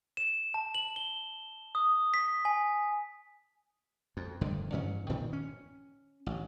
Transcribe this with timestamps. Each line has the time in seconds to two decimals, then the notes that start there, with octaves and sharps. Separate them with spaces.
0.17 E7
0.54 A5
0.75 F#7
0.96 G7
1.75 D#6
2.14 B6
2.45 G#5
4.17 F2
4.41 F1 G2 D3 D#3
4.72 A1 G2 C#4
5.09 A#2 D#3 F3
5.33 C#4
6.26 A1